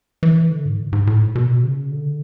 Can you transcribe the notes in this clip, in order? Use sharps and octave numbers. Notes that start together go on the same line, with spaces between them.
E3
D3
G#2
G#2
A2
B2
C#3
D3